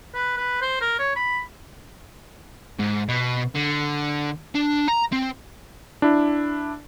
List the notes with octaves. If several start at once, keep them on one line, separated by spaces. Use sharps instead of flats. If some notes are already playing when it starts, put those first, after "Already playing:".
B4
B4
C5
A#4
C#5
B5
G#2
B2
D3
D4
A#5
C4
D4 E4